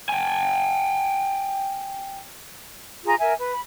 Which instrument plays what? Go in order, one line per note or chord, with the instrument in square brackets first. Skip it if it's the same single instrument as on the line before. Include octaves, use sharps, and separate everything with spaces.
[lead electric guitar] G5 G#5
[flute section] F4 G#4 A#5
A#4 E5 G#5
B4
B5